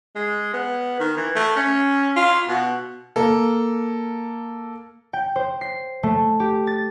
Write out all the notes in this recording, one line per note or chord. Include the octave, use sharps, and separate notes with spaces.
G#3
B3
D#3
E3
A3
C#4
F4
B2
A#3 A4
G5
C5
C7
A3
G4
A6